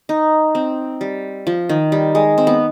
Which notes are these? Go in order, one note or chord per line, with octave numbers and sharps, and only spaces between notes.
D#4
C4
G3
F3
D#3
G3
G#3
C4
B3